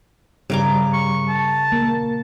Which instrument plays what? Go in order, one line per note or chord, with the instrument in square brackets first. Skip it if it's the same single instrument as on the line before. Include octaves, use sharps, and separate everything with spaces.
[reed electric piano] G2 G3 [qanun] C#3 A#4 D6
[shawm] C#6
A5
[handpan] A#3 [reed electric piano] A#4